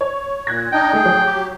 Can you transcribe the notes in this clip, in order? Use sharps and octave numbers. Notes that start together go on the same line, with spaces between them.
C#5
A#2 F#6 G#6 A#6
D4 D#4 D#5 G5
A3 D#4 G#4
F#3
G4